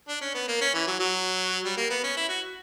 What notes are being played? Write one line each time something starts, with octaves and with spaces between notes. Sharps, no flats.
D4
C#4
B3
A#3
C#4
E3
F#3
F#3
G3
A#3
B3
C#4
E4
F#4